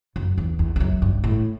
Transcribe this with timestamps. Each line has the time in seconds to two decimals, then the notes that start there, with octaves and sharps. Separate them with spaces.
0.16 F#2
0.38 E2
0.59 E2
0.76 E2
0.80 F#2
1.02 G2
1.24 A2